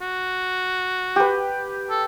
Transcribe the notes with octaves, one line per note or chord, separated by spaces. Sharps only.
F#4
G4 B4
A4